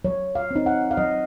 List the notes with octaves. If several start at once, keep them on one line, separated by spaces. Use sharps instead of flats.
F#3 C#5
F5
C4 D#4
F#5
F5
F#3 D#5